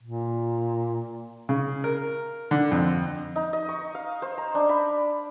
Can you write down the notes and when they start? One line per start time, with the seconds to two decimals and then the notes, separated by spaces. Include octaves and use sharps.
0.03 A#2
1.49 C#3
1.84 A#4
2.51 D3
2.72 F2
3.36 D#4
3.53 D#5
3.69 C#6
3.95 F5
4.22 C5
4.38 A#5
4.55 D4
4.69 B5